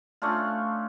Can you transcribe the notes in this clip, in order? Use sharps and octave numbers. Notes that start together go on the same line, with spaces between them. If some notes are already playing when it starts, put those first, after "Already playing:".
A3 C#4 D4 F4